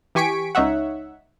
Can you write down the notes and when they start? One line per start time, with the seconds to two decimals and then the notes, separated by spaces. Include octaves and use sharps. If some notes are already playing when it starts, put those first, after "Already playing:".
0.15 E3 G4 G#5 C#6 B6 D7
0.55 C#2 D#4 C#5 E5 F#5